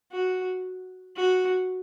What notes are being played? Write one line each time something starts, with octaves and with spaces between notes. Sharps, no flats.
F#4
F#4